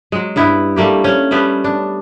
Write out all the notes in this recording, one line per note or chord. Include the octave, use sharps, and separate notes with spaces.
F#3 G#3
G2 B3 E4
G3 A3 A#3 G4
C#4
G3 A3 B3 G4
D4